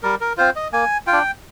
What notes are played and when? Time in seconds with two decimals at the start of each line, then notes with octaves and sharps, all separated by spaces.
0.03 G3 A#4
0.21 A#4
0.37 C4 F4 C5
0.56 D#5
0.72 A#3 G#5
1.07 F4 G5
1.12 D4